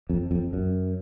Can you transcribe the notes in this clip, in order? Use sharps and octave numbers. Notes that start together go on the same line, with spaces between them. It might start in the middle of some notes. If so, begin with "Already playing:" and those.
F2
F2
F#2